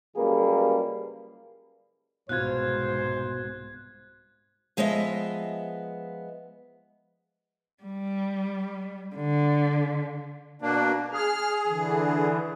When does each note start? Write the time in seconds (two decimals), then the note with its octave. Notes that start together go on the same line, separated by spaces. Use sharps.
0.16 C#2 F#2 G3 A#3 G#4 B4
2.29 C2 G#2 B2 F4 C5 F#6 G#6
4.77 F3 G#3 B3 D#5 E5
7.83 G3
9.15 D3
10.62 B2 A#3 D4
11.12 G#4 F6
11.67 D3 E3